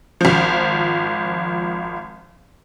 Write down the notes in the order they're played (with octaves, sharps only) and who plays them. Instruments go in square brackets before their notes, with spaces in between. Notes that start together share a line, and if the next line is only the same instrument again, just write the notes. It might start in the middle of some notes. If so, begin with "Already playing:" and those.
[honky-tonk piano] G#1 F3